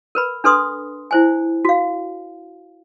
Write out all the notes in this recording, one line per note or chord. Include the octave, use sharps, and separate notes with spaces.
A#4 B4 B5
D4 A4 B4 C6 D#6
E4 C5 G#5
F#4 F5